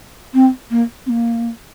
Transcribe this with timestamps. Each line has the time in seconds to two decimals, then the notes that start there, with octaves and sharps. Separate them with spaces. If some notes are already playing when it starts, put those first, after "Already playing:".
0.34 C4
0.70 A#3
1.06 C4
1.09 A#3